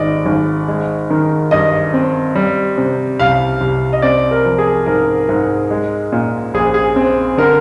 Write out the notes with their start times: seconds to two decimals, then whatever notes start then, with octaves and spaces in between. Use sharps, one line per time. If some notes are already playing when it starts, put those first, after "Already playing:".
Already playing: G#1 G#2 D5 D#5
0.26 G#1
0.68 G#3
1.10 D#3
1.51 G2 D#5
1.94 C4
2.35 G3
2.78 C3
3.19 C2 F5
3.61 C2
3.93 D#5
4.02 C4 D5
4.31 A#4
4.45 F3
4.58 G#4
4.86 G#2 A#4
5.29 G#2
5.71 G#3
6.12 A#2
6.54 A#1 G#4
6.74 G#4
6.96 C4
7.38 D3 A#4